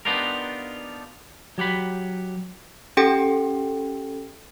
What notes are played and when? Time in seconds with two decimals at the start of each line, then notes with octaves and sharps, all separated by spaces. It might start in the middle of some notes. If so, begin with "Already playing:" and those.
0.05 B3 D4 D#4 F4 G4 A#4
1.58 F#3 G4 F#5 B5
2.97 C#4 G4 A4 G5